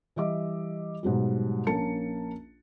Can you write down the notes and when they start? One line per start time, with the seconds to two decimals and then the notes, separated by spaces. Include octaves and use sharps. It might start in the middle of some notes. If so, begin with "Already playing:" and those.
0.16 E3 G3 D#5 E5 D6
1.03 G#2 B2 F#3 G3
1.67 A#1 A#3 C#4 A#4 A5 C#7